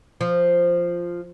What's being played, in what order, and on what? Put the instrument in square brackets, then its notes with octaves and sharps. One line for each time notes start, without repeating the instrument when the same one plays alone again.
[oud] F3